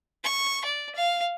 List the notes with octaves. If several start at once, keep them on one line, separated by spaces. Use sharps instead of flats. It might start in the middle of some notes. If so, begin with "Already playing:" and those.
C#6
D5
F5